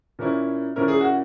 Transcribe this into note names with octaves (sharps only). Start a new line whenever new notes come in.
A#2 A#3 C#4 E4
A#2 A#3 C#4 E4 A#4
G#4
F#4